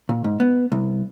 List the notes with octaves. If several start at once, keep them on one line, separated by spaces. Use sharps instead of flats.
A#2
G#2
B3
C2